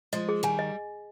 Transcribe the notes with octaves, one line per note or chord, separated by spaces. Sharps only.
F3 G#3 D#5
G#4
D#3 G3 G#5
D#5